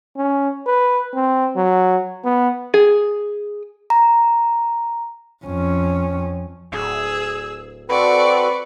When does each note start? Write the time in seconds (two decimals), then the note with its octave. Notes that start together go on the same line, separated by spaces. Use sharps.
0.17 C#4
0.66 B4
1.14 C4
1.56 F#3
2.24 B3
2.74 G#4
3.90 A#5
5.45 F2 C#4
6.72 D1 G#4 E6
7.90 C4 F#4 A4 B4 D5 C#6